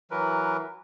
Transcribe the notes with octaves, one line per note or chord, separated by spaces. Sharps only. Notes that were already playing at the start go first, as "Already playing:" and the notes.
E3 F#3 A#4 B4